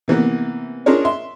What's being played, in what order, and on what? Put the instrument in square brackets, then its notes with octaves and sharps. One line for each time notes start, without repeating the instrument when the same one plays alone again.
[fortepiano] C3 E3 A#3 B3
C#4 D4 F4 G#4 A#4 C#5
E5 C6